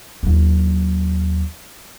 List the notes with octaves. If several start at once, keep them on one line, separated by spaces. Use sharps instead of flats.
D#2 F#3